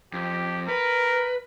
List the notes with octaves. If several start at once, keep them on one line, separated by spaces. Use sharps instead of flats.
F2 G4
A#4 B4